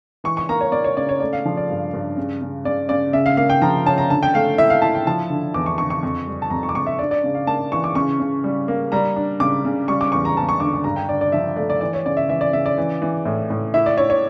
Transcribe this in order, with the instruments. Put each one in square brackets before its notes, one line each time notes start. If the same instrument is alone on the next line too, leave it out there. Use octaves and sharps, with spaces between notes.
[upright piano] E3 C#6
C#6
A#3 A#5
C#5
A#3 D5
C#5
C#3 D5
C#5
A3 D5
F5
F3
D5
G2
G2
C#3
C#3
C#3 D5
C#3 D5
C#3 E5
F5
A#3 F5
G5
F3 A#5
C#4 A5
A#5
D3 A5
G5
A3 F5
E4 E5
F5
E4 A5
G5
F3 A5
D3
E2 D6
C#6
D3 C#6
C#6
F2
G3
A5
F2 A#5
C#6
D6
F2 C#6
E5
D4 D5
D5
C#3
F5
A#3 A5
E3 C#6
D6
C#3 C#6
C#3
G3
A#3
G3 A#5
D4
C#3 D6
C#3
G3 C#6
D6
E2 C#6
A#5
E2 A5
C#6
D3 D6
C#6
G2 A#5
G5
D3 D5
D5
F3 E5
A3 D5
D5
E3 D5
C#5
C#3 D5
E5
E3 E5
D5
C#3 E5
D5
E3
E3
A2
A2
E4 E5
D5
E4 C#5
C#5